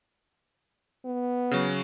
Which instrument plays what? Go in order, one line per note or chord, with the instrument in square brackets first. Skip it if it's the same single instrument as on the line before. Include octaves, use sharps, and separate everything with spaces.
[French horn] B3
[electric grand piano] C#3 F#3